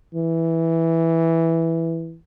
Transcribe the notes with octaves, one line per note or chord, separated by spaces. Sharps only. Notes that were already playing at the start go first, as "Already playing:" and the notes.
E3